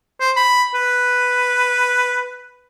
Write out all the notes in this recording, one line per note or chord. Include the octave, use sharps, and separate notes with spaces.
C5
B5
B4